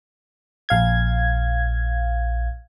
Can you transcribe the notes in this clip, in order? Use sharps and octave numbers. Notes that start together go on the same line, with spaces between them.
A#1 F5 G#6